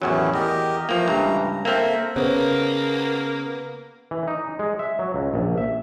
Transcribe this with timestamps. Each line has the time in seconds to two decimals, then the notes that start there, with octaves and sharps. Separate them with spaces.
0.02 A1 E2 D#3 F#3 C#4 E4
0.34 E2 G4 A#4 D#5
0.89 E3 F3 A3 A#3 A#5
1.08 C#2 G2
1.65 A#3 C4 A4 A#4 E5
2.16 C#3 A#3 B3 C5 C#5
4.11 E3
4.28 D#4
4.59 G#3
4.79 E5
4.99 F#3
5.14 C#2
5.34 A#1
5.57 E5